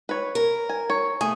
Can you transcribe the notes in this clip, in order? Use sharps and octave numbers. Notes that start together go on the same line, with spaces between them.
B4 C#5
A#4
G#5
C#5
A3 G#4